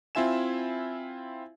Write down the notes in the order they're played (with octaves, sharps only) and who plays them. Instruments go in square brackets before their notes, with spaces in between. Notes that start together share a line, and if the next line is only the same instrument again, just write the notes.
[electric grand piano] C4 E4 F4 E5 G#5 E7